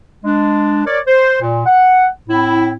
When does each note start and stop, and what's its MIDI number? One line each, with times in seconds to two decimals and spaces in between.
0.24 0.82 56
0.24 0.82 62
0.86 0.99 70
0.86 0.99 73
0.86 0.99 74
1.06 1.41 72
1.41 1.66 46
1.66 2.06 78
2.28 2.73 45
2.28 2.73 60
2.28 2.73 64